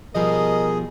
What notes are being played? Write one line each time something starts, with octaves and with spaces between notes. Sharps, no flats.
B2 F3 G3 G#4 A#4 D#5